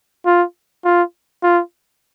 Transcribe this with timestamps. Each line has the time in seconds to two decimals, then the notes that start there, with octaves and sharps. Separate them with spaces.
0.26 F4
0.85 F4
1.43 F4